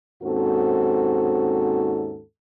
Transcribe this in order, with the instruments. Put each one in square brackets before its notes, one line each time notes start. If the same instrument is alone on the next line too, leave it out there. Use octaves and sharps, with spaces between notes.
[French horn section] D#2 G#2 C4 C#4 F#4 A4